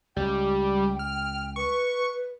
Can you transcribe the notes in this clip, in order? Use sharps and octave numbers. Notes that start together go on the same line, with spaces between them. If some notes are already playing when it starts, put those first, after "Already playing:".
C#2 G3 G5
F6
B4 C#6